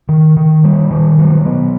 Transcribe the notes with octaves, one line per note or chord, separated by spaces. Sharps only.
D#3
D#3
G3
D#3
F#3
B3